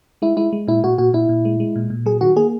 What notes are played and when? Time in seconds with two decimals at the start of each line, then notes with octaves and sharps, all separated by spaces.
0.22 G#3 E4
0.37 G#3 E4
0.53 G#3
0.68 A#2 E4
0.83 A#2 F#4
0.98 A#2 F#4
1.14 A#2 E4
1.29 A#2
1.45 G#3
1.60 G#3
1.76 A#2
1.90 A#2
2.06 F#3 G#4
2.21 D#3 F#4
2.36 A#3 G#4